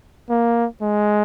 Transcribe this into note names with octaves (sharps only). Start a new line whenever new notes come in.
A#3
G#3